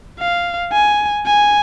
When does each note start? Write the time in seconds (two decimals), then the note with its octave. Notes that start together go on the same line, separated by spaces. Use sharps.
0.20 F5
0.73 G#5
1.27 G#5